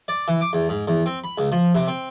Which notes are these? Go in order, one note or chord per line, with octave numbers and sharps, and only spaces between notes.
D5
E3
D6
E2
G#2
E2
C4
B5
C#2
F3
C3
C4